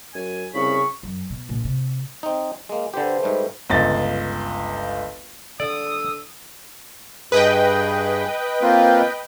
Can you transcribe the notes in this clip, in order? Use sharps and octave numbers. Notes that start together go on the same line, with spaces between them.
F#2 G#5
C2 C#3 B5 C#6
F#2
B2
A#1
C3
C4 D#4
G#3 A#3
D3 G4 A4 B4 C5
G#2 G3 A3
G1 C#2 A6
D3 D5 D#6 E6
G2 G#4 B4 D#5 G5
A#3 C4 F4